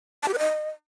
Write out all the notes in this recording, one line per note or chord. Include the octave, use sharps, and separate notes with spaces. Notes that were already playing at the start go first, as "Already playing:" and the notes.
A5
G4
B4
D#5